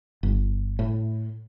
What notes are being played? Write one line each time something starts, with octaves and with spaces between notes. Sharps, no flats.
G1
A2